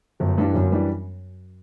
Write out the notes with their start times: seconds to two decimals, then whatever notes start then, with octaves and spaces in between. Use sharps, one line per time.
0.20 G1 F#2
0.38 G2 E3 G3 D4
0.54 G1 F#2
0.71 E3 G3 D4